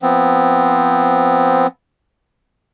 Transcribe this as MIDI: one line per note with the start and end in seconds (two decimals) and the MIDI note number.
0.02 1.67 53
0.02 1.67 59
0.02 1.67 60